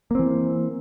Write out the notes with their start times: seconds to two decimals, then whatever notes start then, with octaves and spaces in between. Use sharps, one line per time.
0.11 A#3
0.15 C4
0.19 E3